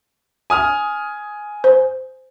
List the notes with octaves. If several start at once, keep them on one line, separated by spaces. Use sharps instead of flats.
G#5 D#6 F6
C5